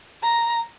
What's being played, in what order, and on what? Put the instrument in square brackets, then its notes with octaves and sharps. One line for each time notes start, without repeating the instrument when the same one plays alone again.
[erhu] A#5